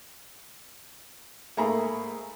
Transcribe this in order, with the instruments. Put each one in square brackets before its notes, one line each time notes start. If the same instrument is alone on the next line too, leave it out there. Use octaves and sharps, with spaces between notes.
[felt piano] G#2 A3 A#3 G#4 A#5 B5